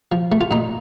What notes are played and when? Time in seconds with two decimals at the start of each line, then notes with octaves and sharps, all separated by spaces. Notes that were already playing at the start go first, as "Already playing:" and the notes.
0.12 F3
0.32 A3
0.41 F4
0.51 A#2 D#4